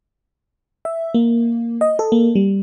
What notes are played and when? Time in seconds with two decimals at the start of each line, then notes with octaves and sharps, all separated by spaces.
0.85 E5
1.14 A#3
1.81 D#5
1.99 A4
2.12 A#3
2.35 G3